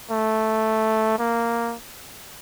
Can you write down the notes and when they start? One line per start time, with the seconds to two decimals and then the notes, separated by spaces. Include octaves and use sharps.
0.11 A3
1.19 A#3